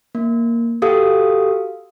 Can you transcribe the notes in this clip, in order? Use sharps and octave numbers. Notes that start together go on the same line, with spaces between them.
A#3
F#4 G4 A4 F5 D#6 E6